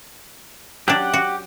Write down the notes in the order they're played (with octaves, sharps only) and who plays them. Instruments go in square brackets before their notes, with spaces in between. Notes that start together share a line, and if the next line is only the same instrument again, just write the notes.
[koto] F#3 D4 [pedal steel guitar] G4 F#5
[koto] F#4